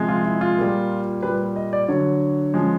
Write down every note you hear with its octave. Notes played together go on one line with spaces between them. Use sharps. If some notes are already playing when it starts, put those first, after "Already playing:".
Already playing: C3 F3 G#3
F4
E4
F4
A#2 G3
A#2 G3 B4
D#5
D5
D3 F#3 C#5
C#3 F3 G#3